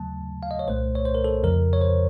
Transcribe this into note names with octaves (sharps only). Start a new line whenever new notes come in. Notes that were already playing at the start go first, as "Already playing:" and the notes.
Already playing: D#2 C#3 F#3 A3 A5
F5
D#5
C#5
C2 A#2 A3 C5
C#5
C5
A#4
A4
F2 C#3 F3 A#4
C#5
C5